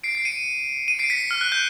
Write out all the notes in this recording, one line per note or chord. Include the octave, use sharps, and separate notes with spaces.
C7 D7
C7 D7
C#7 D#7
D#7
C7 D7
B6 C#7
B6
F6
F#6
G6